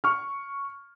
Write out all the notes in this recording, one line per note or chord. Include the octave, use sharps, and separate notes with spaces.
C#6 F6